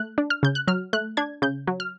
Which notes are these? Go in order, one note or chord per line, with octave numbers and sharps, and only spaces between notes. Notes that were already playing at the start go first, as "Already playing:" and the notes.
Already playing: A3 F#6
D4
F6
C#3 G6
F#6
F#3 F6
A3 F#6
D4 G#6
C#3 G6
F#3
F6